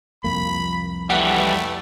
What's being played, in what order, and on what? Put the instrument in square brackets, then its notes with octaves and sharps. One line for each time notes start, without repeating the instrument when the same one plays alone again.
[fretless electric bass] C2 F2 A#3 [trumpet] B5
[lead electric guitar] E3 G3 [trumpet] A3 [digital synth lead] F#5